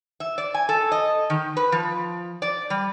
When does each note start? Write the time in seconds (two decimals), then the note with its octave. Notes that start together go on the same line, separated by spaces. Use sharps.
0.20 E5
0.38 D5
0.54 G#5
0.69 A4
0.92 D#5
1.30 D#3
1.57 B4
1.72 F3
2.42 D5
2.70 G3